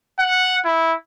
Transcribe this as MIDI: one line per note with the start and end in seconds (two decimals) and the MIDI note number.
0.19 0.57 78
0.65 0.94 64